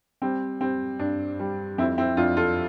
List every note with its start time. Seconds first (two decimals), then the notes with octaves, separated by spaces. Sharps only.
0.22 G3 C4
0.61 G3 C4
0.99 G2 D4
1.39 G3
1.78 F2 C4 E4
1.98 C4 E4
2.17 F2 D4 F4
2.37 F4 A4